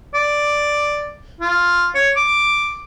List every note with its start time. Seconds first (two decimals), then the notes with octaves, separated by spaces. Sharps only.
0.14 D5
1.41 F4
1.95 C#5
2.16 D6